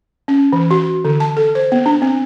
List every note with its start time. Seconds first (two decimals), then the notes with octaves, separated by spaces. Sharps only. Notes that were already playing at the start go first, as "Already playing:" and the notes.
0.28 C#4
0.53 E3
0.71 F#4
1.05 D3
1.20 A5
1.37 A4
1.55 C5
1.72 B3
1.86 D4
2.02 C4